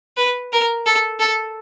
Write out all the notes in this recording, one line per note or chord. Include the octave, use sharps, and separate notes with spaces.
B4
A#4
A4
A4